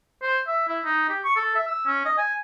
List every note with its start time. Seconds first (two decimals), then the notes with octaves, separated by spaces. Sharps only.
0.22 C5
0.47 E5
0.68 E4
0.85 D#4
1.09 G4
1.24 C#6
1.36 A4
1.55 E5
1.68 E6
1.87 C#4
2.05 D#5
2.18 G#5